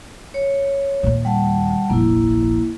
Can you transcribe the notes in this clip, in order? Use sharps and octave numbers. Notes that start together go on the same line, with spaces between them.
C#5
D#2 A#2
G3 F#5 A5
F1 A#1 A#3 E4